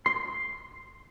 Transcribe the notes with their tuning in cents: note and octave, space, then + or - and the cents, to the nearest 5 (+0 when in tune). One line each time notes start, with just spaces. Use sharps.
C6 +0